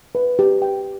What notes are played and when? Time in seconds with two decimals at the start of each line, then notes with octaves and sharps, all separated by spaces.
0.15 B4
0.39 G4
0.62 G5